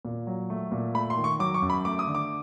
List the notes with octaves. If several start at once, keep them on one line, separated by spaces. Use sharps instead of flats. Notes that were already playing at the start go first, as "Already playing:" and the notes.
A#2
F#3
A3
A#2
A3 B5
C6
D#3
C#6
F#3 D6
C#6
F#2
B5
A3 D6
D#6
D3
D6